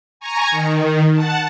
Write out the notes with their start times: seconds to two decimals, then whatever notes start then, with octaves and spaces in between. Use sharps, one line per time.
0.20 G#5 A#5 C#6
0.51 D#3
1.15 F#5 A5